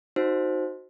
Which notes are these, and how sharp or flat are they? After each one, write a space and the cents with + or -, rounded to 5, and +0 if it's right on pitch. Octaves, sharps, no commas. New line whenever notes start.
D#4 +0 F#4 -5 C5 +0